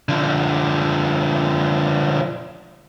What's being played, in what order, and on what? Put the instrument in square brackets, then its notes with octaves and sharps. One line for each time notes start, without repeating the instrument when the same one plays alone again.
[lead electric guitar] D3 F3